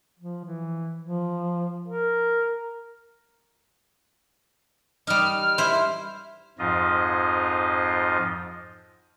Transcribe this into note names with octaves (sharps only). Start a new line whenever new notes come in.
F3
E3
F3
A#4
G3 D#4 F6
E4 C5
F2 G#2 F3 F4 D#5